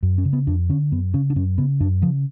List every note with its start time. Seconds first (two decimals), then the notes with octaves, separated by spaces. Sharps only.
0.03 F#2
0.18 C#4
0.25 C#3
0.33 B3
0.47 F2 D4
0.69 D3 C#4
0.92 F#2 B3
1.14 C#3 C#4
1.30 D4
1.36 F#2 C#4
1.58 C#3 B3
1.80 F#2 D4
2.02 C#3 F3